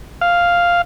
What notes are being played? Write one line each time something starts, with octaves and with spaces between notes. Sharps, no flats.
F5